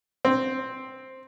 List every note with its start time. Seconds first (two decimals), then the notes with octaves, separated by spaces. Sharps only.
0.25 C4